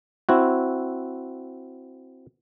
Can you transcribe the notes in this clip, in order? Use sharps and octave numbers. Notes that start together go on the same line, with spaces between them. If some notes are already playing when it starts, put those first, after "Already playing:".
C4 E4 F#4